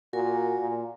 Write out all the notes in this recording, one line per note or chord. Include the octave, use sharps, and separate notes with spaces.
A#2 F#4 A#4 G#5
A#2